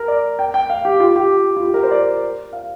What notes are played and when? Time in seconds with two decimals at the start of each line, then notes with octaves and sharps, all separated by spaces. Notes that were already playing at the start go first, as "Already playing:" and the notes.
Already playing: A#4
0.08 D5
0.39 G5
0.54 G5
0.70 F5
0.85 G4
1.00 F4
1.16 G4
1.57 F4
1.65 G4
1.74 A#4
1.83 C5
1.91 D5
2.53 F5